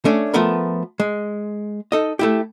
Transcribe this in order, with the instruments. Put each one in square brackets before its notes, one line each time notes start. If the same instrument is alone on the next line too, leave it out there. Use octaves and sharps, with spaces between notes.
[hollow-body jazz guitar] A3 C#4 D4
F3 A3 B3 A#4
G#3
D#4 A4 D#5
A3 E4 G4